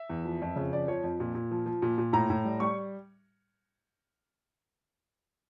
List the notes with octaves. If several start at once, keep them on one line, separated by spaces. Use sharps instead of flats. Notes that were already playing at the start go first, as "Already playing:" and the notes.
Already playing: E5
E2
F3
F2
C#3
F2 D5
F3 C#5
F2
A#2
A#2
F3
F3
A#2
A#2
A2 A#5
A2
G3
G3 C#6